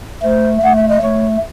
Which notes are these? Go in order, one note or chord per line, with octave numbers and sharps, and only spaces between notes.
A3 C5
A3 F#5
E5
D#5
A3 C#5